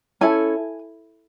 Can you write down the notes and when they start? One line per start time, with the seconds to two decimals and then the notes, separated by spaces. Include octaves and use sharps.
0.21 C#4 E4 A4 G#5